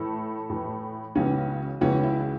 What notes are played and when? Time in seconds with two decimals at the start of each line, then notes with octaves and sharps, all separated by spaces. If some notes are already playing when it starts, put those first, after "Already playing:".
Already playing: A2 E3 E4 A4
0.50 A2 E3
1.15 C#2 C#3 E3 C#4 F#4
1.81 C#2 C#3 E3 C#4 F#4
2.03 E4